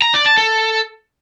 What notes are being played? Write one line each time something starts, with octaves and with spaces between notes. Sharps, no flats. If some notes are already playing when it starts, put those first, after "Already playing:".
A#5
D5
A5
A4